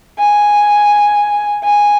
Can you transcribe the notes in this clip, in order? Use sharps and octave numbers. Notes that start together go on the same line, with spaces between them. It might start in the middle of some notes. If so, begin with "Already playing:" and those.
G#5
G#5